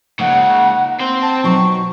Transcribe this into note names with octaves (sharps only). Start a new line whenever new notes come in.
C#2 C#3 A#3 D#4 A#4 F#5
C4 C5
A5
B2 F#3 D#4 C#6